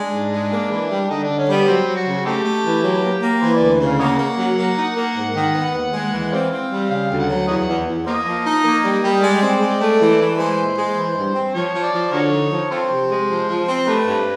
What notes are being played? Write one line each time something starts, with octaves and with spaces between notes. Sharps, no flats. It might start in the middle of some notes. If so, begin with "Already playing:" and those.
Already playing: G#3 D4
G#2
G#3
A#3
E3
G3
D3 D#4
D3 D4
C#4
G3 B3
F#3 C4
F#3
F#4
C#3
A3 C4 D#4 G4
A3
E3
F#3
A#3
A#3
E3 C5
D5
D2
C#3 F5
A#3 C#5 D#5 F#5
A#3
F#3
A#3
D#4
A#3
G#2
D#3
B3
D#2
G#3
E3
C4 C5 D5 F5
C4
G3
C#3 F5
D2
F#5
F#3
E2 C#5 D#5 F#5
E2
E2
A#3 A#4 C5 D#5
F3
D#4
A#3
G3
G3
G#3 D5
C4
G#3
A3
E3
E3
G#3 C5
A#2
G#3
E3
G2
C4
F3 C#5
F3
D5
F3
D3 F#4 A#4 C#5
D#4
F3
C4 F4 A4 C5
C3
G#3
F3
F3
C4
A3 D#4 G4 B4
G2